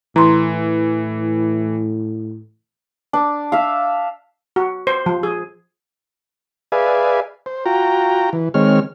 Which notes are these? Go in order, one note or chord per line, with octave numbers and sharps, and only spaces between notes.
A2 E3 A#5 C6
D4
E5 F5
F#4
C5
F3
G#4
G#4 B4 D5 E5 F5 G#5
C5
F4 F#4 G5 A#5
E3
D#3 G#3 C4 C#5 F6